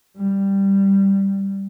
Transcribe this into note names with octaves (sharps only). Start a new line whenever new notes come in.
G3